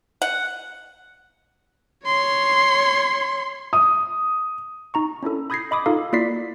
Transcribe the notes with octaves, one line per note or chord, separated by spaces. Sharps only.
F#5
C#5 C6
D#6
D#4 A#5 C#6
C#4 D4 E4 A4
B5 D#6 G6 G#6 A#6 C7
D#5 B5 D6 D#6
D#4 F4 A4 F5
A#3 E4 F4 D5 B6 C7